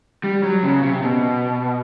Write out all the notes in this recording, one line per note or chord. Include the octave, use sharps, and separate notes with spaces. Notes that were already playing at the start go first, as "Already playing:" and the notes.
G3
F#3
C#3
C3
B2